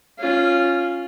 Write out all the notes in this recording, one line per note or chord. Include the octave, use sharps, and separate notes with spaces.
C#4 F4